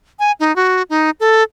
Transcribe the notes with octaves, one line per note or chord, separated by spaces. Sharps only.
G#5
D#4
F#4
D#4
A4